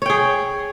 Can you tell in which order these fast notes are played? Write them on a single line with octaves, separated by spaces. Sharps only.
C#5 G5 G#4